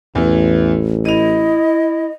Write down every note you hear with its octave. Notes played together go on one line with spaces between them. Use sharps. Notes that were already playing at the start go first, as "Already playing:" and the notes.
A1 E2 E3
E4 D#5 D#7 F7